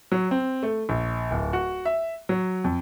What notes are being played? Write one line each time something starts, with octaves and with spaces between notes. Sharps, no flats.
F#3
C4
A3
A#1
D1
F#4
E5
F#3
F2